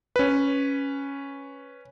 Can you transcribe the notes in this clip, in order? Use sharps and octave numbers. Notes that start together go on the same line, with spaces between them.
C#4 B4